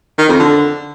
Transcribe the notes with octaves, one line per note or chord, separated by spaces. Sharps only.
D#3
F2
D3